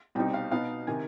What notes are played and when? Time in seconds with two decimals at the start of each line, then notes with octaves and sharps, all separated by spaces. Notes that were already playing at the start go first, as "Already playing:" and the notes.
0.15 C2 B2 G3 C4 D#4 G5
0.34 F5
0.51 B2 B3 D#4 F5
0.87 C3 D#3 G#5